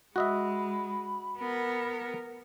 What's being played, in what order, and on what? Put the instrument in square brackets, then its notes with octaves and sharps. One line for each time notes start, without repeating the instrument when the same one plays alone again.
[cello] G#3 [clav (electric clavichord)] F#4 D#5 E5 [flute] B5
[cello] B3 A#4